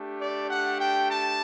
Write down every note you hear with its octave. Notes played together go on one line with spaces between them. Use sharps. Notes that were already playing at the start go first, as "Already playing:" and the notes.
Already playing: A3 D4 G4
D5
F#5
G5
A5